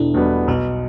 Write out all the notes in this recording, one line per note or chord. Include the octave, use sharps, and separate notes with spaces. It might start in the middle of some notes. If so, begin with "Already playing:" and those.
Already playing: E1 D4 E4 A4
E2 B2 G3 B3
B1 B3